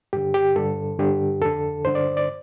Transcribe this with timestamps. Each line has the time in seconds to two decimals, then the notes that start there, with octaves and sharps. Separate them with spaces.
0.13 G2 D3 G4
0.34 G4
0.56 G2 D3 A4
0.99 G2 D3 G4
1.42 F2 D3 A4
1.85 G2 D3 C5
1.95 D5
2.17 D5